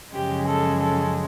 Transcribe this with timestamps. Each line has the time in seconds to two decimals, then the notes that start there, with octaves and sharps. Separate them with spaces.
0.15 F#2 C#3 F3 G#3 G4
0.48 A4
0.81 A4